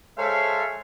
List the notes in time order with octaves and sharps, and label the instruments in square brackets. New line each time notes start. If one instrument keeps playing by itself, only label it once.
[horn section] G#3 A4 C5 C#5 E5 F5